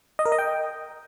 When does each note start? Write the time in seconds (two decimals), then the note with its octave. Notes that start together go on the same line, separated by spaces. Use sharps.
0.19 D#5
0.26 A#4
0.32 D#5
0.39 G5